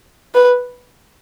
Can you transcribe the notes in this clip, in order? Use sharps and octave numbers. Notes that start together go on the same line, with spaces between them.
B4